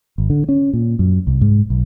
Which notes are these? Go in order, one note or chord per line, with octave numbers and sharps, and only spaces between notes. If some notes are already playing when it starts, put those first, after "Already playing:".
G#1
D3
C#4
A#2
F#2
C2
G#2
B1